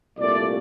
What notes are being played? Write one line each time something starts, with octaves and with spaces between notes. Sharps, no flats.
C2 A#2 A3 D5